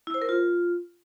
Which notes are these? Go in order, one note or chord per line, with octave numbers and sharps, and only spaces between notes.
E4
C5
A#4
F4